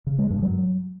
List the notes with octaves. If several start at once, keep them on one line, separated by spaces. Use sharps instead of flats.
C#3
G#3
G2
F#3